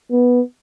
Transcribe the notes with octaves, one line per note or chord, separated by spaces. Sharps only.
B3